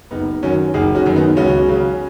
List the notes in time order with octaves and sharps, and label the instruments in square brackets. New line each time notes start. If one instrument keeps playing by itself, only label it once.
[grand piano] F#1 B3 D#4
F#2 D#3 C#4 F#4
F#1 D#4 G#4
C#4 F#4
F#2 D#3
B3 D#4
C#2 C#4 F#4
C#3 F#3